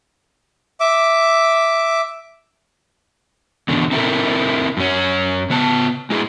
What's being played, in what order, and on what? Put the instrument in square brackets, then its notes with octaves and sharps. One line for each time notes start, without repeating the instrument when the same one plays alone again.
[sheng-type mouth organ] E5 D6
[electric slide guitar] E2 B2 D3
C4 D#4 E4 G4 A4 A#4
F#2 C#4
C#3 B3 A5
G#3 E4 G#4